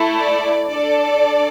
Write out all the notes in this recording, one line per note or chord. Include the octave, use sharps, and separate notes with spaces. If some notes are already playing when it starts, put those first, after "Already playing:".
Already playing: A3 E4 A4
D5
D4 A4 D5